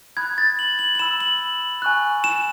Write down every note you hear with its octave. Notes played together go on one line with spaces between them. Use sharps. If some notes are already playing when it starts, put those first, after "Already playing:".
B5 D#6 F#6 G#6
A6
F#7
F#7
F#7
B5 E6 E7
F#7
G#5 C#6 F#6
E7